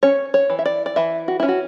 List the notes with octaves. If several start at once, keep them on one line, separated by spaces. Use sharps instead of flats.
C#4 C#5
C#5
E3
E5
D5
D5
E3 E5
F#4
C#4 E4
F#4